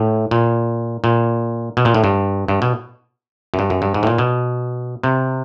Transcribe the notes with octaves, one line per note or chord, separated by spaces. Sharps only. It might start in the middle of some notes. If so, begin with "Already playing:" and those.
Already playing: A2
A#2
A#2
B2
A#2
A2
G2
G2
B2
F#2
G2
F#2
G2
G#2
A2
A#2
B2
C3